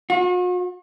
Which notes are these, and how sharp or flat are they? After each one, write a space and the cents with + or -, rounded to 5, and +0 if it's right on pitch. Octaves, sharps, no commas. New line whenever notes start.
F#4 -45